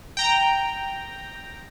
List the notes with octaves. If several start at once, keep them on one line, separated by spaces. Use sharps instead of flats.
G5 A#5